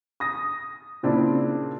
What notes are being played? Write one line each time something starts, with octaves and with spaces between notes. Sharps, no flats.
D#6 A#6
A#2 C#3 C4 D4 E4